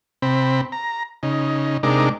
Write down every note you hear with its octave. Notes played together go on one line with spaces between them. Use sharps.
C3 C4 B5
A#5
C#3 D#4
C3 G#3 D4 D#4 A#4 D6